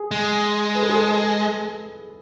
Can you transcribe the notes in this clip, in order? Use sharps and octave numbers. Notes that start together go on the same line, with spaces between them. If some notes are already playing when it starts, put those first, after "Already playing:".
Already playing: G#4
G#3
B4
A4
G#4
A4